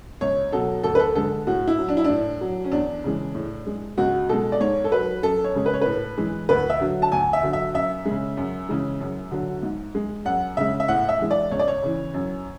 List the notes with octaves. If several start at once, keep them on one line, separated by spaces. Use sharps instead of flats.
C#2 C#5
B2 F#3 A4
D2 A4
B4
A4
D3 G#3 A4
A2 F#4
E4
F#3
D4
E4
A2 D4
F#3
C#4
E2 D4
C#3 E3 G#3
A2
G#3
C#2 F#4
B2 G#3 A4
D5
G#2 C#5
A4
F#3 B4
F#2 A4
C#5
C#3 G#3
B4
C#5
A2 B4
E3 G#3
D2 B4
E5
D3 F#3
A5
D2 G#5
E5
D3 F#3
E5
F#2 E5
G#3
C#3
F#2
C#3 E3 G#3
F#2
D3 F#3
G#2
G#3
F#2 F#5
C#3 G#3 E5
E5
A2 F#5
E5
E3 G#3
D5
C#2 C#5
D5
C#5
C#3 E3
F#2